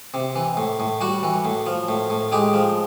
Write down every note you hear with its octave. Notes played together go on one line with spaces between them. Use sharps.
C3
E3
A2
A2
G3 F#4
E3
A2
F3
A2
A2
G#3 G4
F3